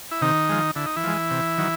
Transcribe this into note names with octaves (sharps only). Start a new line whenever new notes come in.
E4
C3 D#3 D#4
F3 G#3
D3 E4
D#4
E3 E4
F3 G#3
C3
D#3 F#3